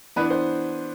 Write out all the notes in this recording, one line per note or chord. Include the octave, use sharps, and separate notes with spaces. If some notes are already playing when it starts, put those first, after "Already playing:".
E3 B3 D4 B4
C5